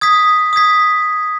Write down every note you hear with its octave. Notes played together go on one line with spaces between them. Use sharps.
D#6 G#6 B6
D#6 G#6 B6